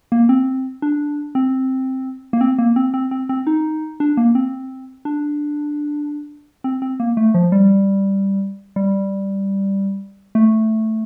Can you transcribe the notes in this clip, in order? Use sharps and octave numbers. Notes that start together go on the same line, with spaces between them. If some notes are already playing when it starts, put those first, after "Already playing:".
A#3
C4
D4
C4
A#3
C4
A#3
C4
C4
C4
C4
D#4
D4
A#3
C4
D4
C4
C4
A#3
A3
F3
G3
G3
A3